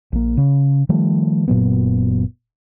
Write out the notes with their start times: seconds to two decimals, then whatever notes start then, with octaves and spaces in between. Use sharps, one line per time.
0.12 A#1 A#3
0.37 C#3
0.89 D#3 F3 G3 A3
1.48 F#1 A#2 F#3 B3